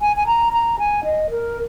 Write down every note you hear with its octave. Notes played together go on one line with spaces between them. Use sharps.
G#5
G#5
A#5
A#5
G#5
D#5
A#4